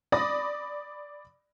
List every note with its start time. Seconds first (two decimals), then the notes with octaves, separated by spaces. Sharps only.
0.12 D5 B5 D#6 A#6